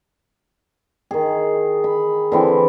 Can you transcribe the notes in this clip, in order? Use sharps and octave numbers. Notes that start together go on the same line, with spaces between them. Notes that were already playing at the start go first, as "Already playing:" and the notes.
D#3 G#4
B5
D3 E3 C4